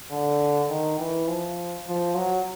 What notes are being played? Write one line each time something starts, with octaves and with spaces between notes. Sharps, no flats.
D3
D#3
E3
F3
F3
F#3